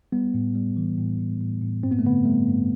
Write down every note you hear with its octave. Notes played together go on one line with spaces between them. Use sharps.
G3 B3
A2
G3
E3
A2
A2
A2
A2
G2 C4
B3
A3
D3 B3
G3 A3
G2